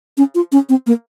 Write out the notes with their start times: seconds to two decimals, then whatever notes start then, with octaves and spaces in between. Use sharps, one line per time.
0.17 C#4
0.35 F4
0.52 C#4
0.69 C4
0.87 A#3